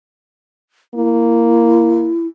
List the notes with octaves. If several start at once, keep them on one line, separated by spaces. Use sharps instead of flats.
A#3 E4